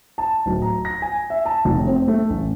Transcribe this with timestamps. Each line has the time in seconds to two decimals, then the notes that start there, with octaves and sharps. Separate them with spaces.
0.18 A5
0.46 D1
0.62 A#5
0.85 A#6
1.02 G#5
1.30 E5
1.46 A5
1.65 F1
1.87 C4
2.08 A3
2.30 A1